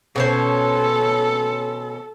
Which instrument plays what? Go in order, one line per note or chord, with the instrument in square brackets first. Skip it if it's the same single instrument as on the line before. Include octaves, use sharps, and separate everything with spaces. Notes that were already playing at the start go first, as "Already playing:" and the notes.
[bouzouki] B2 C#4 C5 [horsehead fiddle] A4